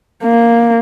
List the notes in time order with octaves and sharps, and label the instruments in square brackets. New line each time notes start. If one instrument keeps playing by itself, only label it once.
[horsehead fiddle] A#3